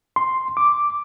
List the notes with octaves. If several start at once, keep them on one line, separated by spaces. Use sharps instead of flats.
C6
D6